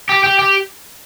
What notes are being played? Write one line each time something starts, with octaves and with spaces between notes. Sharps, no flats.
G4
G4
G4